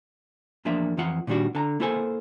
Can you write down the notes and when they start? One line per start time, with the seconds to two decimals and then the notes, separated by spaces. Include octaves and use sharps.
0.65 E2 F3 A#3 D4 E5
0.97 F2 E3 F4 F#5
1.27 A#2 D#3 G3 D4 F#4
1.55 D3 A5 A#5
1.80 A#3 E4 F4 A4 C5 G#5